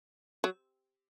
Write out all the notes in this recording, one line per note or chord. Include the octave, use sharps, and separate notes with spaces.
F#3